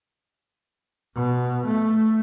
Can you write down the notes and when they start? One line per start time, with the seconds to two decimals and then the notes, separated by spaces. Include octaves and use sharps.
1.16 B2
1.67 A3